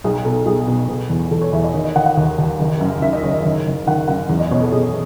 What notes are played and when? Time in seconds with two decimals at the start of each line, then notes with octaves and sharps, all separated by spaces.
0.04 B1 G#4
0.25 B2 A4
0.46 B1 G#4
0.68 B2
0.88 B2
1.10 E2
1.31 E2 A4
1.41 C#5
1.53 E2 E5
1.64 D#5
1.74 D#3 C#5
1.84 D#5
1.96 D#3 F#5
2.06 F#5
2.17 D#2
2.38 D#2
2.59 F#1
2.81 F#2
3.02 D#3 E5
3.13 D#5
3.23 F#1 C#5
3.34 D#5
3.45 D#3
3.66 F#1
3.87 D#3 F#5
4.08 F#2 F#5
4.29 E2
4.40 D#5
4.51 B2 C#5
4.62 A4
4.72 B2 G#4